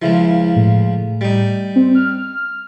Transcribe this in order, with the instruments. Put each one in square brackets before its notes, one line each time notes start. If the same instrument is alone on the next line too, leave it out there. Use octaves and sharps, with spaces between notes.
[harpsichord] C#2 C#3 F3 [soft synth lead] E4
[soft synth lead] A2
[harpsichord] G3 D#4
[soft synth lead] C4
F6